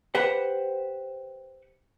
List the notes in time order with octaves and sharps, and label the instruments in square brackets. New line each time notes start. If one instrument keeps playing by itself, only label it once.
[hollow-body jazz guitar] G4 B4 C5 F#5